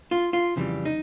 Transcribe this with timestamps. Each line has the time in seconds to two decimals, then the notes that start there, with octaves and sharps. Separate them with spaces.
0.11 F4
0.33 F4
0.56 F2 C#3 E3 G3
0.85 D#4